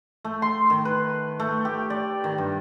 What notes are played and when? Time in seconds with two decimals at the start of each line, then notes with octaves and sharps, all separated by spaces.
0.25 A3
0.42 C6
0.70 D#3
0.85 B4
1.40 A3
1.65 G4
1.90 D5
2.24 D#3
2.38 G2